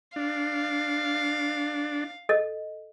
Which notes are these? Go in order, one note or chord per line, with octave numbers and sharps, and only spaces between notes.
D4 F5
A4 D#5